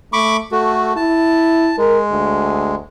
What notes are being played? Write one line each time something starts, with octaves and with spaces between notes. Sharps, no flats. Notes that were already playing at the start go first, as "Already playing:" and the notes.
A3 B5 C#6 D6
A3 F#4 A4
E4 A5
G#3 A#4
D2